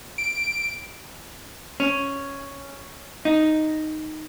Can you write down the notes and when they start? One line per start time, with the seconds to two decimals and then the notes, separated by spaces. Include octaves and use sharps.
0.18 D7
1.80 C#4
3.25 D#4